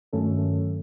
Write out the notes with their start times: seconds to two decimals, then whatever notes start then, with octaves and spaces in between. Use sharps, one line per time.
0.13 G2 D#3 F#3 A3 C#4 A4